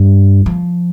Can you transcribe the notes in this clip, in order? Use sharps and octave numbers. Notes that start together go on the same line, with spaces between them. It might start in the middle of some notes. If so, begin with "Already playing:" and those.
Already playing: G2
F3